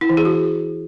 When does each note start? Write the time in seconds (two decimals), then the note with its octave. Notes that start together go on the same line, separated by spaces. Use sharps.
0.01 E4
0.09 E3
0.17 G#4
0.25 F#4